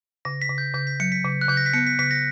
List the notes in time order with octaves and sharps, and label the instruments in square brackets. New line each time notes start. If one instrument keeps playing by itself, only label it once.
[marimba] C#3 [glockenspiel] A#6
[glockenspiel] B6
[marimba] C#3
[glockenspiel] G6
[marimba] C#3 [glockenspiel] G6
[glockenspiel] B6
[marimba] F#3 [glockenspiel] C#7
[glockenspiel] B6
[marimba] C#3
[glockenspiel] F#6
[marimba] C#3 [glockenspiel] G6
[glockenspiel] A#6
B6
[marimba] B3 [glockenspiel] C#7
[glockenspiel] B6
[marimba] C#3 [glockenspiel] B6
[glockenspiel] A#6